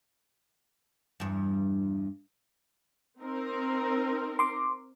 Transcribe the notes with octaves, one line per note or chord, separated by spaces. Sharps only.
E2 G2
C4 D#4 A#4
C6 D6